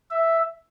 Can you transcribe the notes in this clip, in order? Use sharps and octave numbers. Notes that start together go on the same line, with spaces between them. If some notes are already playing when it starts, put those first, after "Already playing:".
E5